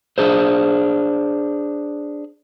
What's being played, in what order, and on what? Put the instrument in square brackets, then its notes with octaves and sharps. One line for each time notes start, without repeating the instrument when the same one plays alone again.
[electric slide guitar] D4 G#4 C5